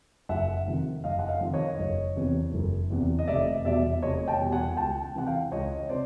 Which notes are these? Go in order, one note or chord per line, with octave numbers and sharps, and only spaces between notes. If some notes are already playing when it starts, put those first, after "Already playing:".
F#1 E5 F#5
F2 C3 D#3
F#1 D#5 F5
F#5
D#5 F5
F2 C3 D#3
C#5 D#5
F#1
E2 C3 E3
F#1
E2 C3 E3
D#5
F1 D5 E5
E2 B2 G3 D5 E5
F1 C#5 D#5
G5 A5
E2 B2 G3
F#5 G#5
C#2 G5 A5
C3 E3 F#5
F5 G5
C#2 C#5 D#5
C3 C5 D5